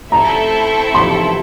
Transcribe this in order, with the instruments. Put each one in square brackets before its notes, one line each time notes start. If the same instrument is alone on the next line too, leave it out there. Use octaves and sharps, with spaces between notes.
[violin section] A3 C4 E4 A4 E5 [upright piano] A#5
[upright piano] C6